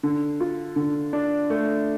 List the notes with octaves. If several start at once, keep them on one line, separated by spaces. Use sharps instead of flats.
D3
F4
D3
D4
A3